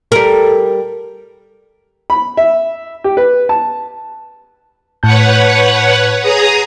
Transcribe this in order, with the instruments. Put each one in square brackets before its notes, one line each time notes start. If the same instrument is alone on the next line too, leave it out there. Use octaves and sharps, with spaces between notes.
[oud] G3 A#4 [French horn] A4
[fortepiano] B5
E5
G4
B4
A5
[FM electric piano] A2 A5 G6 [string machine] B4 C#5 F#5
[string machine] G#4 A#5 D#6